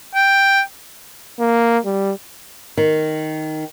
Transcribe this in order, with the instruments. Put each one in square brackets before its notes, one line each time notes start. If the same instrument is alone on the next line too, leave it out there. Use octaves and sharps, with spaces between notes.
[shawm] G5
[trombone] A#3
G3
[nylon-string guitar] D#3